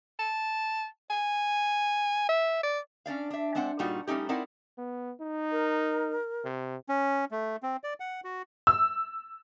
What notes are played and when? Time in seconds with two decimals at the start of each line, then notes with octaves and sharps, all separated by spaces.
0.19 A5
1.10 G#5
2.29 E5
2.63 D5
3.06 C#4 D4 D5 F5
3.30 D4 E5
3.55 G#3 C4 D4 C5 F#5
3.79 G2 A#2 G3 D#4 F4 F#4
4.07 G3 A3 C#4 D#4 G4
4.29 C4 D#4 E4 A#4 D5 F#5
4.78 B3
5.21 D#4
5.52 A#4
6.45 C3
6.89 C#4
7.31 A3
7.63 C4
7.84 D5
8.00 F#5
8.24 F#4
8.67 E6